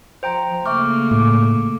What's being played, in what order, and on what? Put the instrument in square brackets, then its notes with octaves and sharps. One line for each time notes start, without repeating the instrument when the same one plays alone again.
[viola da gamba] F3 [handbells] C5 G5 A#5
[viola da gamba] C#3 A3 A#3 [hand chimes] E5 C#6 D6 [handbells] F6
[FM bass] A2 [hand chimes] D6